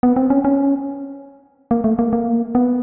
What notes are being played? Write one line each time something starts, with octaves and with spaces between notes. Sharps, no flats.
B3
C4
C#4
C#4
A#3
A3
A#3
A#3
B3